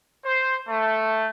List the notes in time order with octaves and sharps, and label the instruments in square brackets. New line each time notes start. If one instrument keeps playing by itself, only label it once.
[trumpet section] C5
A3